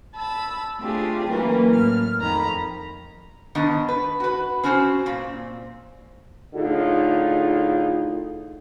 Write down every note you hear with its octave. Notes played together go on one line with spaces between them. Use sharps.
A5 B5 E6
A3 C4 D4 F4 G4 G#4
E3 F#3 A#3 C#4 A#4 B4
A2 F6
F2 D#3 A#5 B5
G#2 D#3 B3 D4 D#5
B4
F#4 B4
C4 C#4 F#4 A#4 C5
A#2 C4
A2 D3 D#4 F4 G#4